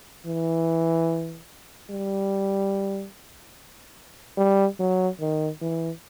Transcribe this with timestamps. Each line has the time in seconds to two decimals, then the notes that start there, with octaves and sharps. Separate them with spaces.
0.26 E3
1.90 G3
4.37 G3
4.79 F#3
5.20 D#3
5.62 E3